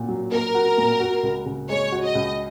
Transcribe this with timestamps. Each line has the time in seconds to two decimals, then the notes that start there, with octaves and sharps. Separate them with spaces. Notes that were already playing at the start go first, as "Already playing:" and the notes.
Already playing: A#2 F#4
0.08 F#3
0.32 A#3 A#4
0.55 F#4
0.78 A#2
1.00 F#4
1.23 C#2
1.46 C#3
1.69 G#3 C#5
1.92 F#4
2.04 D#5
2.15 C#2